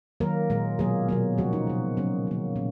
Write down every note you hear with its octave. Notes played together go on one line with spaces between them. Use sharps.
D#3 F#3 A#3 A#4
A#2 G#3
B2 F#3 A#3 G#4
B2 F#3 A#3
C#3 F3 G#3 F#4
D#4
B2 G#3
C#3 F#3 A#3 C#4
D#3 A#3
A#2